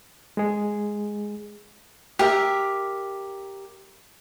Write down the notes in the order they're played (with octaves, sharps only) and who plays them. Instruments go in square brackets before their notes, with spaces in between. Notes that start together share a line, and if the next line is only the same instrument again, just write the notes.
[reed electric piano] G#3 G#4
[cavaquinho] G4 A#4 E5